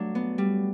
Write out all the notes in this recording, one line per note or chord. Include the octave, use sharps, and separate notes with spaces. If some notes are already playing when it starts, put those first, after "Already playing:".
Already playing: G2 F#3 A3 D4
B3
G3